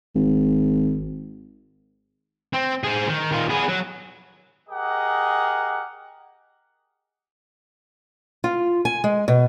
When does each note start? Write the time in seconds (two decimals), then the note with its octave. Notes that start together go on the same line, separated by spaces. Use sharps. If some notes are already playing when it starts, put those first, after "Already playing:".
0.15 G#1
2.53 C4
2.84 G#4 C5
3.08 D#3
3.32 D#3 F4
3.49 B3 G#4
3.68 F#3
4.69 G4 G#4 A#4 D#5 F#5
8.44 F4
8.85 G#5
9.04 G#3
9.28 B2